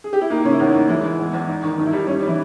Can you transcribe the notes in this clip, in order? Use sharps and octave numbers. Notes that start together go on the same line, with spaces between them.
G#4
G4
E4
A#3 D#4
C#3 C#4
E4
E2 D#4
A#3
E3 G#3 E4
G#3
E2
E2
D#4
D#3
G2 D#4
E4
G3 D#4
G3 C#4
D#4
G3
E3 E4